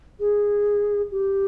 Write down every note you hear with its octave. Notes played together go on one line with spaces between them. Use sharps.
G#4
G4